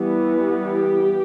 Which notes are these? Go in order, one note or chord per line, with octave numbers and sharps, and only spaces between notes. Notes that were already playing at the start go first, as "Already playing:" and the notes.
Already playing: E3 G3 B3
G4